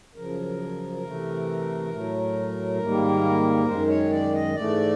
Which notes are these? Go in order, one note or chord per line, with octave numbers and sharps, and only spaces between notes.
F#2 C#3 F3 A#4
C3 E3 A3
A2 F#3 A3
G#2 D#3 G3 A#3
F#2 D#3 G#3 C5
C#5
D5
D#5
G#2 E3 A3 D5